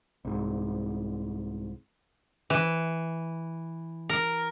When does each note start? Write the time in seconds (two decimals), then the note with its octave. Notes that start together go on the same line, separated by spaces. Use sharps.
0.25 C2 G#2
2.50 E3
4.09 A#4